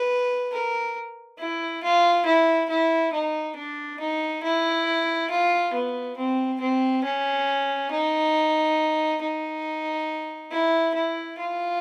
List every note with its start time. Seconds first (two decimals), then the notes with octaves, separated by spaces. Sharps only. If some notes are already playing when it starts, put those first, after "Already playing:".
Already playing: B4
0.52 A#4
1.39 E4
1.83 F4
2.25 E4
2.70 E4
3.13 D#4
3.56 D4
4.00 D#4
4.43 E4
5.30 F4
5.73 B3
6.17 C4
6.60 C4
7.04 C#4
7.91 D#4
9.21 D#4
10.51 E4
10.94 E4
11.38 F4